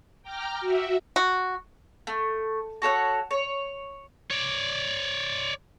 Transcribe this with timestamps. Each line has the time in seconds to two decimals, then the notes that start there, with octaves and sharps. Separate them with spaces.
0.23 G5 A#5 D6 F6
0.60 F#4 E5
1.16 F#4
2.07 A3
2.82 F#4 A4 C#5 F#5
3.31 C#5
4.30 C#5 D5